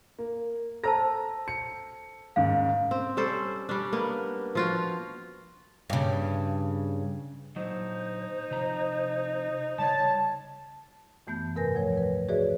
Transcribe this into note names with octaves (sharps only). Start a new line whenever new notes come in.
A#3
A4 C5 A5 A#5 E6 A#6
C#7
D#2 G#2 C#3 F5
C4
G3 C#4 A4 C5
G3 C#4 D4
A#3 B3
F3 F4 F#4
G2 C#3
A#2 D3 F#3 D#4 C5
C3 F3 A#5
C#3 G3 C#5 A5
F#2 E3 A3 B3 G6
G#2 C3 A#4 B4 G#5 A#6
D#2 F3 A3 C#5
B4
F#4 G#4 B4 C#5 D5 E5